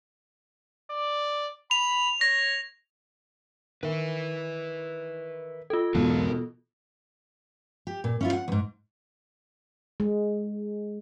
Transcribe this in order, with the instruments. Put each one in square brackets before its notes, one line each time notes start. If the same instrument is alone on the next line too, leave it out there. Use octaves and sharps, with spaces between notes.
[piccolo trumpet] D5
[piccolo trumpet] B5 [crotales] F7
[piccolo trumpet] C#5 [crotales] A#6
[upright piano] D#3 [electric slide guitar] B4 E5
[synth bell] F4 A4
[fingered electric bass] E2 G#2 [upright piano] B2 [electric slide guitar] A#4 F5 A5
[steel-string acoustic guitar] G4
A#2
C#4 E4 F4
F#5
E2 G#2
[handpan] G#3